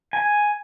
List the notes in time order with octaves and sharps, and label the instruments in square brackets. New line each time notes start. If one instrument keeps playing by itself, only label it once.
[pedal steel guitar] G#5